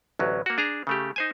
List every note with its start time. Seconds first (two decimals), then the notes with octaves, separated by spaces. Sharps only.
0.19 A1 D2 F#3
0.46 A#3 F#4
0.58 D4 G#4 A#5
0.87 C#3 A3 G4
1.16 D#4 C5 G#5